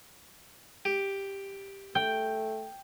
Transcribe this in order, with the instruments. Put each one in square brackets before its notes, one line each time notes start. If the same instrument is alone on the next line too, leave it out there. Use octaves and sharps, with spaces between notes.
[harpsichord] G4
[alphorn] A3 [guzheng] G5